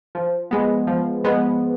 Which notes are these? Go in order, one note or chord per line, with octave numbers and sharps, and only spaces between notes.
F3
G#3 B3
F3
G#3 B3